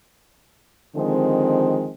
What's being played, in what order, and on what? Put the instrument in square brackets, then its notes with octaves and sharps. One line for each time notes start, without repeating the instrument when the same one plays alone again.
[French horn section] D3 D#3 F3 G#3 C4